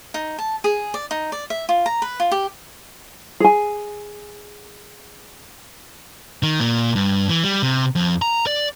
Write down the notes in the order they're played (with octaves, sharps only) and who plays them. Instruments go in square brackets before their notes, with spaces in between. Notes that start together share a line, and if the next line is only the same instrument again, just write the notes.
[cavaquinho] D#4
A5
G#4
D5
D#4
D5
E5
F4
A#5
B4
F4
G4
[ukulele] G#4 G#5
[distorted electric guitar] D#3
A#2
G2
E3
G3
C3
F2
A#5
D5